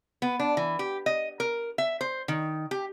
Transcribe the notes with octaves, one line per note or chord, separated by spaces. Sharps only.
B3
D4
E3
G4
D#5
A#4
E5
C5
D#3
G4